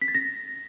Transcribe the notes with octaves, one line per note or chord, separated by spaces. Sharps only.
B6
A6
A#6